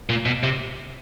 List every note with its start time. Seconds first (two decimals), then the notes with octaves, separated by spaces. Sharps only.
0.09 A#2
0.26 B2
0.43 C3